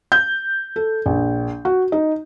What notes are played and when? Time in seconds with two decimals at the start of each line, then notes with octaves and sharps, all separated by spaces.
0.12 G6
0.76 A4
1.06 A#1
1.65 F#4
1.92 D#4